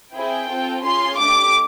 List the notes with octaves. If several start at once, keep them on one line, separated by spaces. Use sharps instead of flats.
C4 E4 G#4 G5
C4 F4 A4
C#4 F4 G#4 C6
A3 D4 G4 D6